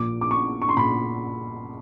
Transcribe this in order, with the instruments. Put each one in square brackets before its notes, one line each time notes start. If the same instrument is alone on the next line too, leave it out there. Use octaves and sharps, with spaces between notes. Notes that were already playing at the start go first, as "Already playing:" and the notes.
Already playing: [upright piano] A#1 A#2 D6
D6
C#6
C#6
C6
A#2 B5